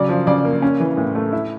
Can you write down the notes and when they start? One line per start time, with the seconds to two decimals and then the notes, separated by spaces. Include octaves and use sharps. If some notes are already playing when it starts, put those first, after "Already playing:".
Already playing: C#3 F#3 D5
0.09 F3
0.27 C#3 D5
0.45 A#3
0.62 C#4
0.80 E3
0.97 A2
1.15 A3
1.32 E4